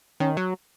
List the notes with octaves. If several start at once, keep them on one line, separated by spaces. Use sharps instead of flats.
D#3 C#4
F#3